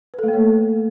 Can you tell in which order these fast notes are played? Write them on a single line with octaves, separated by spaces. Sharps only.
B4 A4 A3 A#3 C#5